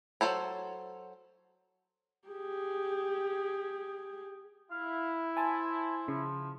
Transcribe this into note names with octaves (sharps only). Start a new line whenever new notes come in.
F#3 A4 C5 C#5
G4 G#4
E4 F5
C5 G#5 A5
C#3 F3